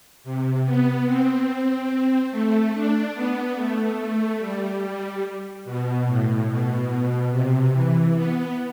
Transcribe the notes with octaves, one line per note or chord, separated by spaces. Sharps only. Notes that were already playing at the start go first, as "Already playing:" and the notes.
C3
B3
C4
A3
D4
B3
A3
A3
G3
G3
B2
A2
B2
C3
E3
B3